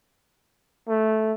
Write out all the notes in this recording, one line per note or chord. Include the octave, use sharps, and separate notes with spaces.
A3